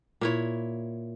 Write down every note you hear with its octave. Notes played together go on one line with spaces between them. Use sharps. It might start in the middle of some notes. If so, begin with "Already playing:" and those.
A#2 E4 C#5